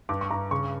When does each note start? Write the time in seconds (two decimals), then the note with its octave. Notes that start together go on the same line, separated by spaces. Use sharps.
0.09 G2 D6
0.21 C#6
0.30 G2 A#5
0.51 C#3 C#6